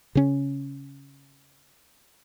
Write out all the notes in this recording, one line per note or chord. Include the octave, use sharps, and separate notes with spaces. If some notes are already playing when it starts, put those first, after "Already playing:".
C#3 C#4